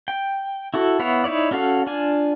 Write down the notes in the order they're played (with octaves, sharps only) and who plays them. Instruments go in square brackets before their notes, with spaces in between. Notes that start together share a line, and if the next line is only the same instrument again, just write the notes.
[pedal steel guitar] G5
E4 F#4 A4
B3 E4 C#5 F5
D#4 E4 C#5 D5
C#4 F#4 A4 F5
D4 F4 G#5